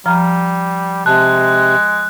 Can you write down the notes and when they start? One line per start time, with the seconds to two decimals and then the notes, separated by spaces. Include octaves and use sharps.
0.06 F3 G3 A#5 F6
1.06 C3 G#3 A5 F#6